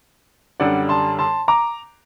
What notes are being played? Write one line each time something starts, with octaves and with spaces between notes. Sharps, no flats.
F#2 D3 G3 D5 F#5
A5 C6
A5 C6
A#5 D6